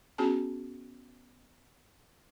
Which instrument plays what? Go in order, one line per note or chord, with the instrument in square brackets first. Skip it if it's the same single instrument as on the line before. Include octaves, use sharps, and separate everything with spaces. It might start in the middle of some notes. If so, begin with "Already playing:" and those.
[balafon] B3 C#4 F#4 G#4 A5